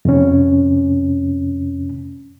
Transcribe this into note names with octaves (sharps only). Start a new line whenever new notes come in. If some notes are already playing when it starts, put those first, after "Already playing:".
F2 C3 C#4